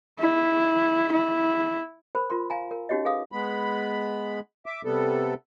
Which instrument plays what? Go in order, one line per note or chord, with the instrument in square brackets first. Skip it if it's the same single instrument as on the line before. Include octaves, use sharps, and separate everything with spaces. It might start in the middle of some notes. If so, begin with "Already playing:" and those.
[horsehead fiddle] E4
E4
[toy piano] A#4 C5 B5
F4 A#4 C6
F5 G#5 A#5
A#4
C#4 D#4 F#4 G4 C#5 D#5
G#4 B4 F5 D#6
[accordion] G#3 B3 B5
E5 D6
C3 G3 B3 A4